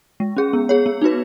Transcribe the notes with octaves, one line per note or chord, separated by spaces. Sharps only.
G#3
C#4 G#4
B3
G#4 C#5
B3
D#4 F#4 B4